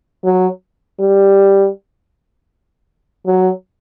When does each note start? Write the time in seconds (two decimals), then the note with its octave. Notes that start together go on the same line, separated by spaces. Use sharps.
0.24 F#3
1.00 G3
3.27 F#3